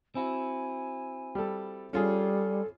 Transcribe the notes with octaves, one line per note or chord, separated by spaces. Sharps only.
C4 E4 F#4 G#5
G3 A4
G3 C#4 F4 G#4 A4